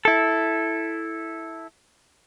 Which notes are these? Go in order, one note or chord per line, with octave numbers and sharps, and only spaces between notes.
E4 A4